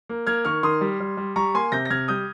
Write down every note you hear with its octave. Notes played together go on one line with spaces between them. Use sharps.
A#3
A#3 F6 G#6
D#3 C#6 F6
D#3 C6 D#6
G3
G3
G3
G3 A#5 C#6
A#3 G#5 C6
C3 G6 A#6
A#6
C3 F6 G#6
G3 D#6 G6